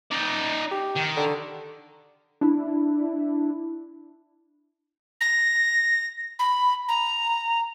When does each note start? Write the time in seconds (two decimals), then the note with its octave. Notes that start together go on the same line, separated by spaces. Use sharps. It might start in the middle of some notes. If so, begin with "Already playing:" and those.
0.11 D#4 D5
0.71 G4
0.96 D#3
1.17 D3
2.41 D4 E4
5.21 A#6
6.39 B5
6.88 A#5